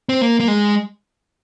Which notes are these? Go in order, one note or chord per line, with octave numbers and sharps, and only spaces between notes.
C4
A#3
A#3
G#3